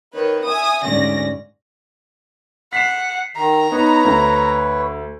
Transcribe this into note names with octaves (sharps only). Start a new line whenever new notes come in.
D#3 B4 C#5
E5 G#5 D#6
D2 G#2 C#4 D5 A#6
F#5 B6 C7 E7
D#3 A#5
B3 D#4 B4 C#5
D2